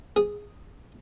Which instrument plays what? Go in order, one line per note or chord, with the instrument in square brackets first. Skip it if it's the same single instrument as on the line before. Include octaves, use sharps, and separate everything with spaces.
[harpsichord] G#4